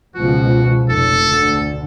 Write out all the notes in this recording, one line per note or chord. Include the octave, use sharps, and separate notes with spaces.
C#2 B2 F3 F#4
F1 A4
D2 D3